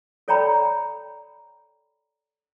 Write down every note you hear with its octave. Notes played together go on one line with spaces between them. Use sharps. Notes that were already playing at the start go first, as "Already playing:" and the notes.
A4 C#5 D5 G5 A#5 B5